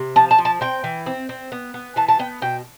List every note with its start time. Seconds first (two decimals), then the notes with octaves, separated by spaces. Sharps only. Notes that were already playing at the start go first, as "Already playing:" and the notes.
Already playing: C3
0.16 F3 A5
0.31 A5
0.38 F3
0.45 A5
0.61 C4 G5
0.84 E3
1.06 C4
1.29 C4
1.52 B3
1.74 B3
1.96 E3 A5
2.09 A5
2.19 B3 G5
2.42 B2 G5